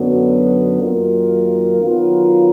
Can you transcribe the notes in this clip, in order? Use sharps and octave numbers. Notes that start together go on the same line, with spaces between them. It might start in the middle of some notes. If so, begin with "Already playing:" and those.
Already playing: F#2 D3 F#3 B3
F#2 D#3 A#3 F4 A#4
D#3 F#3 B3 F4 A#4